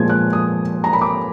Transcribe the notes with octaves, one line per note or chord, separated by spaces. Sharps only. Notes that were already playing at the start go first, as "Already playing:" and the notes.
Already playing: A#2 F3 G#3 B3 G#6
F#6
D#6
A#5
B5
D6